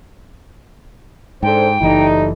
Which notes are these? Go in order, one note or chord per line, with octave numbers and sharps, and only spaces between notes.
G#2 D4 A4 C5 G5
F#1 E3 G3 A3 D#4